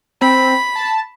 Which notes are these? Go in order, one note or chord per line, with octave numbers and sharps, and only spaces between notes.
C4 B5
A5